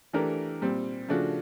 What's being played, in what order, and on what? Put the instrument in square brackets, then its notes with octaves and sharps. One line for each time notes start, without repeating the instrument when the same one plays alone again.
[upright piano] E3 A3 D4 G4 A#4
A#2 G3 C4
C#3 F3 A3 D4 F#4